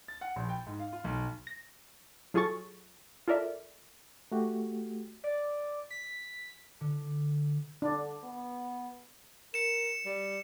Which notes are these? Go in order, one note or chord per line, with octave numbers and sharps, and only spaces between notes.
A6
F#5
A#1
G5
G#2
F5
F4
B1
A#6
F#3 F4 G#4 A4 C#6 A6
F4 A4 A#4 D5 E5
A3 F#4 G4
D5
B6
D3
D3 D4
B3
A#4 C#7 E7
G3